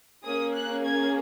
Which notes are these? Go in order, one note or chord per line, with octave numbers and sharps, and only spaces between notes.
A#3 C#4 G#4 D#6
F#6
G#6